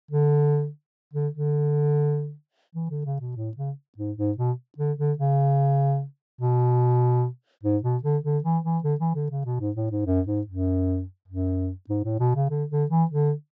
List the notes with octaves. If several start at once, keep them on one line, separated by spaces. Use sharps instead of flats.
D3
D3
D3
E3
D3
C#3
B2
A2
C#3
G#2
G#2
B2
D3
D3
C#3
B2
G#2
B2
D3
D3
E3
E3
D3
E3
D3
C#3
B2
G#2
A2
G#2
F#2
G#2
F#2
F#2
G#2
A2
B2
C#3
D3
D3
E3
D3